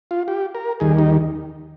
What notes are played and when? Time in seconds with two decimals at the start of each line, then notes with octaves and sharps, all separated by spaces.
0.11 F4
0.28 G4
0.55 A#4
0.80 D#2 D#3 G3 G#4
0.98 D#4